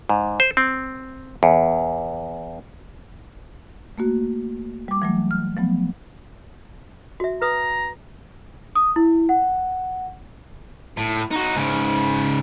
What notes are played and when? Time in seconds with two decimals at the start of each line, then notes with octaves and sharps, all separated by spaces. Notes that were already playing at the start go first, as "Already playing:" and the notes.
0.09 G#2
0.40 C5
0.57 C4
1.43 E2
3.98 A3 A#3 F#4
4.88 G3 D6
5.02 E3 F#3 A3
5.31 F6
5.57 F3 F#3 A3 B3
7.20 F#4 E5
7.42 B4 A#5 D#6
8.75 D#6
8.96 E4
9.29 F#5
10.97 A2
11.31 D#4 F#4
11.55 G#2 C#3